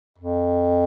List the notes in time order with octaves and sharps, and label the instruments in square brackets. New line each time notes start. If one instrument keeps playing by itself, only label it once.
[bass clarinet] F2